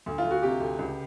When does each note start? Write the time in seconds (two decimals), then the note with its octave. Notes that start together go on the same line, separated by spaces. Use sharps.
0.06 D2
0.18 F4
0.25 D2
0.31 F#4
0.42 C3 G4
0.60 D2
0.79 C#2